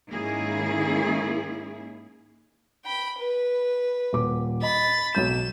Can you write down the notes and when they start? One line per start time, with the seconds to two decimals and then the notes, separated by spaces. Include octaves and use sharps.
0.10 G#2 D#3 A#3 C#4 E4 G#4
2.85 G5 B5
3.18 B4
4.13 D#1 D6
4.62 D#5 B5 A6
5.15 B1 F#3 G6 E7